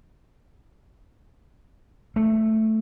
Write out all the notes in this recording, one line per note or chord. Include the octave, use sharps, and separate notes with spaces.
A3